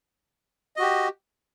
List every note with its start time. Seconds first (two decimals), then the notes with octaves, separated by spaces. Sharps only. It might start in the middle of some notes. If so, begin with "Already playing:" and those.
0.76 D#5
0.79 F#4
0.82 G4